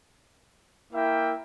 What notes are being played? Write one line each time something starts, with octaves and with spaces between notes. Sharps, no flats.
A#3 E4 A#4 E5 G5